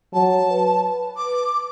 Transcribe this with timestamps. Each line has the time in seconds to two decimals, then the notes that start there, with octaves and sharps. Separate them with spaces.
0.13 F#3 A5
0.51 B4
1.16 D6